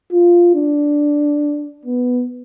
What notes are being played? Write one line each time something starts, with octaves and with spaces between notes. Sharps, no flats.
F4
D4
B3